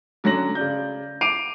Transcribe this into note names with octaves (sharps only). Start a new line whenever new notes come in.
D3 F#3 C#4 A#6 F#7
C#3 D5 G6
D6 C7 D7 D#7 F7